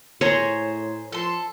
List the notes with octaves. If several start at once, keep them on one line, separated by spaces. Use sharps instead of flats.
A2 G#4 C5 C#5 A#5
F3 A4 C6